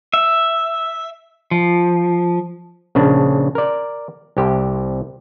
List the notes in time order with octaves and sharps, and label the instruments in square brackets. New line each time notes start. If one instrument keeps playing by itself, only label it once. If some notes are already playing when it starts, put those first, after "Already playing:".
[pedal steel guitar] E5
F3
[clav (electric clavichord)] A#1 C#3 D4
A#4 D5
C2 G4